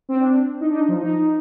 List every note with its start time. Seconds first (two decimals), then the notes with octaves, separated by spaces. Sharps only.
0.09 C4
0.20 D4
0.61 D#4
0.70 D4
0.75 D#4
0.88 F3
1.02 D#4